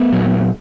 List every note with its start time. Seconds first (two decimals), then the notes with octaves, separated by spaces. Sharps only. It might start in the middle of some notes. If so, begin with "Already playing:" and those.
Already playing: A3 B3
0.12 A#2 F#3